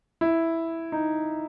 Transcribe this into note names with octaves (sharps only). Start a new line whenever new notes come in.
E4
D#4